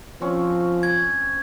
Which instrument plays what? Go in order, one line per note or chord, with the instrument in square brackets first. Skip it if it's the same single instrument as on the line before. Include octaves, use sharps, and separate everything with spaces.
[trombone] F3 [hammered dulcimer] C4 C#4 C#5
[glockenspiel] G#6